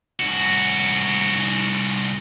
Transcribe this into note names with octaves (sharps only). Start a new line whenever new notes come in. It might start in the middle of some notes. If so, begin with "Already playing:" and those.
C2 F#4